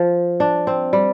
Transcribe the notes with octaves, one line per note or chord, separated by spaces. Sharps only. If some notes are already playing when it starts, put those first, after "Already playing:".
Already playing: F3
D4
C4
G3